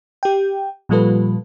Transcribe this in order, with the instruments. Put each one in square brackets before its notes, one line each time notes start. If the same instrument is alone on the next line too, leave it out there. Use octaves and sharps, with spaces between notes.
[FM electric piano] G4 G5
A#2 F3 G3 F4 A4 B4